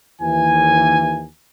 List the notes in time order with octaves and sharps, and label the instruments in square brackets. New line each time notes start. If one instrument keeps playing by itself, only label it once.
[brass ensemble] D#2 E3 G#5